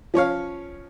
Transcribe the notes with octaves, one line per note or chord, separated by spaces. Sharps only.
F3 C#4 C#5 F5